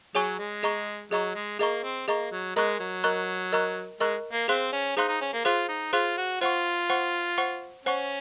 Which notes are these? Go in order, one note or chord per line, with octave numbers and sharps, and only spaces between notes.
F#3 G#4 C#5 G#5 C#6
G#3
G#4 D#5 A#5 C#6
F#3 G#4 D#5 A#5 C#6
G#3
A#3 G#4 D#5 A#5 C#6
C4
A#3 G#4 D#5 A#5 C#6
F#3
G#3 A#4 D#5 A#5 C#6 F#6
F#3
A#4 D#5 A#5 C#6 F#6
A#4 D#5 A#5 C#6 F#6
G#3 A#4 D#5 A#5 C#6 F#6
A#3
C4 G#4 C5 F5 C6 F#6
C#4
D#4 G#4 C5 F5 C6 F#6
D#4
C#4
A#3
F4 G#4 C5 F5 C6 F#6
D#4
F4 G#4 C5 F5 C6 F#6
F#4
F4 C5 F#5 C#6
C5 F#5 C#6
C5 F#5 C#6
C#4 C5 F#5 C#6